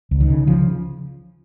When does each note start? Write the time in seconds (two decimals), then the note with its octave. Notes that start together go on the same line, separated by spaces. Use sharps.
0.11 C#2
0.21 D#3
0.30 C#3
0.47 C#3 F3